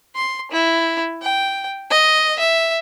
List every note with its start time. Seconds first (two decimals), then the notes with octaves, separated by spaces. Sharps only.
0.16 C6
0.51 E4
1.22 G5
1.91 D#5
2.39 E5